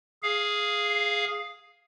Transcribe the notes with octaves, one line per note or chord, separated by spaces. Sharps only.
G#4 F5